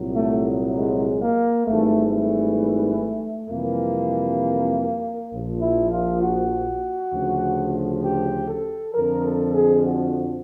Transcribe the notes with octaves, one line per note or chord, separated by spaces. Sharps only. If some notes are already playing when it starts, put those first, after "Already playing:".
Already playing: C2 A#2 F#3
A3
G#3
A#3
G#1 G#2 E3 G3 A3
A3
F2 C3 E3 G3 A#3
A#1 A#2 F3
E4
F4
F#4
D2 C#3 F3
G4
A4
F2 D3 F3 A#4
A4
G#4
F#4